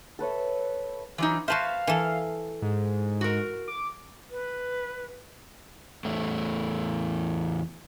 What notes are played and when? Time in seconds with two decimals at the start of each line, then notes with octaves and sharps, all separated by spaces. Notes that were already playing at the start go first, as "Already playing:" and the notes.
0.19 A4 B4 C#5 E5
1.18 E3 F#3 D#4
1.48 F#4 B4 C5 E5 F5 A5
1.87 E3 A4
2.62 G#2
3.21 F#4 A#4
3.68 D6
4.31 B4
6.05 E2 A2 A3